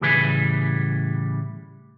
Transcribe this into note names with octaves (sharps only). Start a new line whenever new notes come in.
A2 C#3 E3 G3 B4 G#5